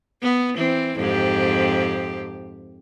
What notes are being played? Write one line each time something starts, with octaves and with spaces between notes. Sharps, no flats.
B3
E3 C4
F2 G#2 G4